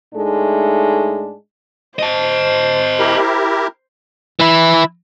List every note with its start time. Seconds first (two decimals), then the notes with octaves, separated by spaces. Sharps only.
0.14 A2 G#3 A3 D4 D#4
1.99 C5 D#5 A5
2.99 E4 G4 A#4
4.40 E3 E4